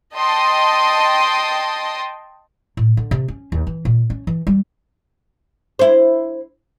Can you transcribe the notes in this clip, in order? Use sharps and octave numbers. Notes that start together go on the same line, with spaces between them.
D#5 G5 A5 C6 D#6
A2
D3
C3
C#4
D#2
E3
A#2
C#4
E3
G3
E4 C5